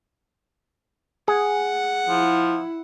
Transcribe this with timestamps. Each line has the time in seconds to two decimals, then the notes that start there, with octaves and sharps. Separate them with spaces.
1.28 G#4 F#5
2.09 F3 E4